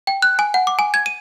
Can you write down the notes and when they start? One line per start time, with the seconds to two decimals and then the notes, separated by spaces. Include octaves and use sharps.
0.07 G5
0.22 F#6
0.39 G#5
0.54 F#5
0.67 D6
0.79 G#5
0.94 G#6
1.06 D#7